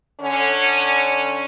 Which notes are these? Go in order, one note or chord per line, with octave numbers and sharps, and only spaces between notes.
D3 C#4